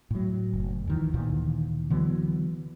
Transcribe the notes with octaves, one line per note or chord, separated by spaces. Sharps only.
A2 F#3
F#1
E2 D#3 E3
D2 A#2 D#3 E3
D3 E3 F#3 B3